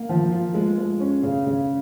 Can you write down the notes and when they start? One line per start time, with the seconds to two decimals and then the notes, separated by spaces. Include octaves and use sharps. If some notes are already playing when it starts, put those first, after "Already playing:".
Already playing: A#3
0.09 F3
0.32 F4
0.54 G#3
0.78 G#3
1.00 C#4
1.23 C#3
1.46 C#3